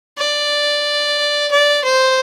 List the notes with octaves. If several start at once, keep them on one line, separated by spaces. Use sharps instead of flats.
D5
D5
C5